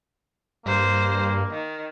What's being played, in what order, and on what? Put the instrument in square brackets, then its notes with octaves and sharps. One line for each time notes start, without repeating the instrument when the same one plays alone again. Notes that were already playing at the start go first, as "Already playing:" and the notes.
[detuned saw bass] G2 [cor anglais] A#3 [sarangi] C5
[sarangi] D#3